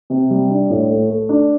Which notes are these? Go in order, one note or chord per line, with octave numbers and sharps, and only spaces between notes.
C3
G3
D4
A2
A3
A3
D4